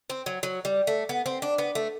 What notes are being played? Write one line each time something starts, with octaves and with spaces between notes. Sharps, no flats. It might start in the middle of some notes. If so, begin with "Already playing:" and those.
C4
F#3
F#3
G3
A3
B3
C4
D4
B3
A3